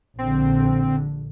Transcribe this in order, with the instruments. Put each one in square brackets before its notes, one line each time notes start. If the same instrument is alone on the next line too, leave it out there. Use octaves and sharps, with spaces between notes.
[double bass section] A#1 D3 [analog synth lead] C4